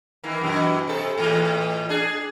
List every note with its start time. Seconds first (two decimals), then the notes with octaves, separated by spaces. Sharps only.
0.24 D#3 E3 A#3
0.41 F#2 B2 E3
0.88 C3 A4
1.18 A2 E3 G#3
1.89 D4 G#4